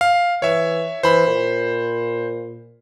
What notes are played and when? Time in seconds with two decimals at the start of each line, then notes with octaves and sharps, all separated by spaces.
0.01 F5
0.42 E3 C#5 E5
1.03 E3 C5 B5
1.27 A#2